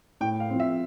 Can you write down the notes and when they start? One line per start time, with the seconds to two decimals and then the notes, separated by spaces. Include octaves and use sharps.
0.21 A2 G5
0.40 F5
0.50 F3 C4
0.60 E5